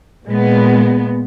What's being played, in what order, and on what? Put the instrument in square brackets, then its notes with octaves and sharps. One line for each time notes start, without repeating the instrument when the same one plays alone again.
[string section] A#2 G#3 B3